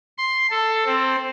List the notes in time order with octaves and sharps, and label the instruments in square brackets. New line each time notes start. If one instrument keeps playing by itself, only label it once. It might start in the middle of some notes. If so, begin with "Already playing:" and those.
[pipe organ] C6
A4
C4